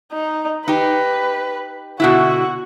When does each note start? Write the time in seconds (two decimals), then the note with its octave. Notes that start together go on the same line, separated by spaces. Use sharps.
0.12 D#4
0.68 D#4 G4 B4
2.00 B2 D3 E4 F#4